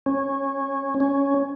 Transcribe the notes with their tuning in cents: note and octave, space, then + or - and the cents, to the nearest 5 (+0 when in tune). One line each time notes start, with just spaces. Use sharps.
C#4 -15
C#4 +5